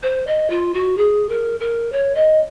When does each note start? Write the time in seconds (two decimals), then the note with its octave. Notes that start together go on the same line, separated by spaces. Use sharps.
0.03 C5
0.27 D#5
0.50 F4
0.74 F#4
0.97 G#4
1.29 A#4
1.60 A#4
1.92 C#5
2.15 D#5